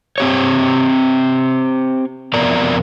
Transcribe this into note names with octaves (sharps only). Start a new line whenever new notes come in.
C4 G4 C#5
F2 C3 B3 A#4 D5 A#5